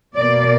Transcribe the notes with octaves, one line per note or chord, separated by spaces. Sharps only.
B2 A#3 D5